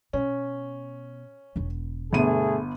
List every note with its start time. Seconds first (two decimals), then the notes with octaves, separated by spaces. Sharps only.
0.13 B2 C#4
1.56 E1 B3
2.13 G1 B2 A3 B3 G#4 D#7